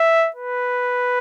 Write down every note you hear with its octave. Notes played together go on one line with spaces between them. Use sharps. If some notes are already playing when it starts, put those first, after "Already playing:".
Already playing: E5
B4